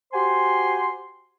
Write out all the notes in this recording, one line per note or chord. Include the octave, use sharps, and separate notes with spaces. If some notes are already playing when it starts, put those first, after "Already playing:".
F#4 G4 C5 G#5 C6